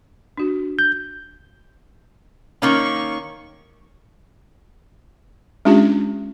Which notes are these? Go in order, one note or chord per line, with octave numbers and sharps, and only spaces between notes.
D4 F#4
G6
D#3 A#3 C#4 C#6
G#3 C#4 D4 F4 G4